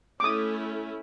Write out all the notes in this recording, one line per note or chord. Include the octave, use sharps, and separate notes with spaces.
A3 C#4 E4 D6 D#6